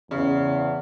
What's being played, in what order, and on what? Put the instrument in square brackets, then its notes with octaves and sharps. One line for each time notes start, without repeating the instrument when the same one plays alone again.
[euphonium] E2 [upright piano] C#3